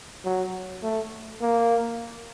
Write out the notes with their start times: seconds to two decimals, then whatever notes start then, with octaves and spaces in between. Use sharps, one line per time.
0.25 F#3
0.83 A3
1.42 A#3